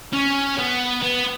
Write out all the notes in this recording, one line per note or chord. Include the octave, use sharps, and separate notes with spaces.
C#4
B3
B3